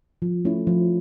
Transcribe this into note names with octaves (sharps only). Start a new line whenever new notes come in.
F3
A3 C#4 E4
F3